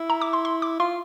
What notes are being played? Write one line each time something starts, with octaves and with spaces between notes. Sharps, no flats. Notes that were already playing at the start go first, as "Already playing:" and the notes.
Already playing: E4
A#5
D6
C6
C6
D6
F4 C6